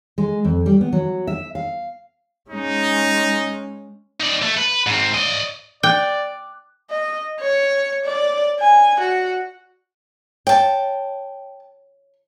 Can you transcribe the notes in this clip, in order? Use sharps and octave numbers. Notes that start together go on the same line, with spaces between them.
G#3
F2
G3
B3
F#3
E5
F5
G#3 C#4 D#4
D#4 D5
A3
B4
G#2 C4
D5 D#5
D5 G5 D6 F#6
D#5
C#5
D5
G#5
F#4
C#5 G5 A5